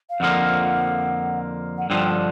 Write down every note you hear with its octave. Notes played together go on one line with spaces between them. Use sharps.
F5
F2 D3 F3 A#3 F#5
F#5
G2 D3 F3 G5